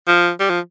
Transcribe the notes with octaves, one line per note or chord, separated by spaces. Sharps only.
F3
G3
F3